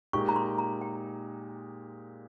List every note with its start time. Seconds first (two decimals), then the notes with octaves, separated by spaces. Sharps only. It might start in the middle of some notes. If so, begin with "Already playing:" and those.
0.13 A#2 G#3 D#4 G4 C#6
0.29 A#5
0.36 C6
0.58 A#5
0.81 G5